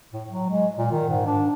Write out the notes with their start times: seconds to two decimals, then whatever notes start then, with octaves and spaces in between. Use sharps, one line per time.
0.13 A2
0.30 F#3
0.50 G#3
0.78 A#2
0.91 D#3
1.09 G#2
1.26 D4